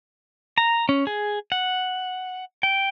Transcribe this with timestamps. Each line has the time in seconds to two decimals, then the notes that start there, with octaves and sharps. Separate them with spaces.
0.58 A#5
0.89 C#4
1.07 G#4
1.52 F#5
2.63 G5